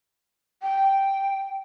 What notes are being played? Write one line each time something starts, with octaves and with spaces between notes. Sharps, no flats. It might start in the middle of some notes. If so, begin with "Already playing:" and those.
G5